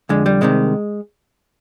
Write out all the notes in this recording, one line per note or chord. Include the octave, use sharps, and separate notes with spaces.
F2 D3 G#3
G3
C2 C3 D#3 G#3